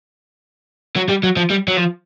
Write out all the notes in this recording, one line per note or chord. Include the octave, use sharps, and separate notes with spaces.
F#3
G3
F#3
F3
G3
F#3
F3